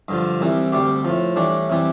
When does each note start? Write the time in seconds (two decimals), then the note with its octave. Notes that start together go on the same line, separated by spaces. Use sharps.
0.09 G2 D3 F3
0.41 C2 C3 E3 G3
0.72 D2 C3 G3 G4
1.05 A2 F3
1.36 A2 E3 G3 D4
1.70 C3 E3 G3